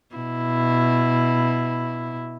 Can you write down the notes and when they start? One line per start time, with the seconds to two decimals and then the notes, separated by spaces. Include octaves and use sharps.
0.15 B2 E4